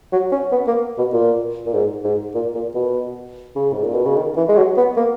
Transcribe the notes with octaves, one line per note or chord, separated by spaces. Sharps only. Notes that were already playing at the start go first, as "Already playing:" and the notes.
F#3
C#4
B3
A#3
B2
A#2
A#2
G#2
G#2
A#2
A#2
B2
C#3
G#2
A#2
B2
C#3
D#3
E3
G#3
F#3
B3
A#3